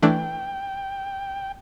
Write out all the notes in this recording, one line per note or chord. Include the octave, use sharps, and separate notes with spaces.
E3 A3 D4 G5